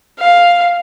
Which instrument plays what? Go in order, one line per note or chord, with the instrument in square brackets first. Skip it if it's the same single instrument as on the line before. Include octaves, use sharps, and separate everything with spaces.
[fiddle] F5